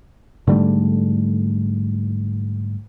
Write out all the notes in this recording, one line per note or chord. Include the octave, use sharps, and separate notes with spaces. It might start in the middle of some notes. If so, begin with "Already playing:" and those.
G#2 D3 G3 A3